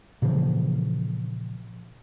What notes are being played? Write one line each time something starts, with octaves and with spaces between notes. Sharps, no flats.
A#2 C#3 E3 F3